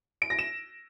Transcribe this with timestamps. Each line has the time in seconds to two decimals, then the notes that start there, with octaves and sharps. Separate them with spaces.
0.22 D7
0.30 A#6
0.39 E7